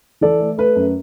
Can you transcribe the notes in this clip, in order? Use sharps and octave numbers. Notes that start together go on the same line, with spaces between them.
E3 A4 D5
A3
A3 B4
F#2